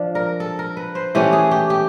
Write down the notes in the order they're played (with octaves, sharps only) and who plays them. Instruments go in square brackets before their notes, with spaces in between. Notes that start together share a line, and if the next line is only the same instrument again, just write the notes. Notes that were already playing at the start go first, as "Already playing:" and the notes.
Already playing: [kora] F3 D4
A#4
A4
A#4
B4
C5
E3 A3 C#4 G4
G#4
G4
G4